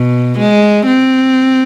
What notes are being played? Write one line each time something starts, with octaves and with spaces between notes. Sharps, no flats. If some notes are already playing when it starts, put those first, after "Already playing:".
Already playing: B2
G#3
C4